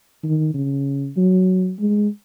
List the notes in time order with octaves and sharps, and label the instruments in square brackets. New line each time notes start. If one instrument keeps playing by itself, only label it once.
[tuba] D#3
C#3
F#3
G#3